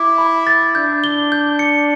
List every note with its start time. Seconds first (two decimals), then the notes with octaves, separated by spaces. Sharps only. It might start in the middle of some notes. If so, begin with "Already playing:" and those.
Already playing: E4 D6
0.18 B5
0.47 A6
0.75 D4 G6
1.04 G7
1.32 G6
1.59 C#7